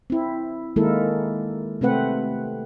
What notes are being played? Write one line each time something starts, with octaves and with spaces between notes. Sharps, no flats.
C4 E4
D#3 G#3 A#3 E4 A4 A#4
C3 A3 C4 B4 F#5